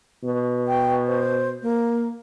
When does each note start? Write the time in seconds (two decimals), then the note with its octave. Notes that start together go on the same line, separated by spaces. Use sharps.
0.24 B2
0.68 G5
1.07 C5
1.62 A#3